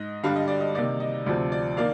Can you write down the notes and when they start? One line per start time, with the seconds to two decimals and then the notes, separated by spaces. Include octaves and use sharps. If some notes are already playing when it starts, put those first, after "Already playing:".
Already playing: G#2 D#5
0.23 G2 D3 G3 D4 F5
0.36 D#5
0.48 D5
0.61 D#5
0.75 C3 D#3 A#3 D#4 D5
1.00 D#5
1.26 D2 C3 F3 C4 D5
1.52 D5
1.77 D#3 A#3 D5 F5